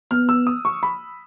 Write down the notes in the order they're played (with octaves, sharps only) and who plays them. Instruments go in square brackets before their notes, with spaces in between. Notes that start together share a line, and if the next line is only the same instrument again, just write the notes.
[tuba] B3 [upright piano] F6
[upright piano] E6
D#6
C#6
B5